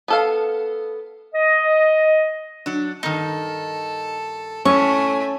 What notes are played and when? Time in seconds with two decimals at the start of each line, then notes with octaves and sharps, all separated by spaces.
0.08 B3 A4 F5
1.34 D#5
2.66 F#3 D4
3.03 G2 D#3 D#4 A4
4.65 A2 A3 C#4 G#5 C#6